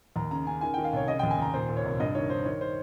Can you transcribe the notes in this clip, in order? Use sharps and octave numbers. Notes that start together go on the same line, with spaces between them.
D#2 A#5
C#3 A#5
C#3 G#5
D#3 G#5
D#3 G5
F5
C2 C#5
C#3 D#5
D#2 G5
G#5
D#2 A#5
A#2 C5
A#2
C#5
C2
G2 D#5
D#3 C#5
D#3 C5
D#3 C#5
C5